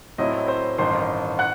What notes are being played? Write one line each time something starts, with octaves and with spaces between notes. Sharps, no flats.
A2 F#3 C4 E4 D#5 D#6
C5 C6
A1 G2 D#3 C5 C6
F#5 F#6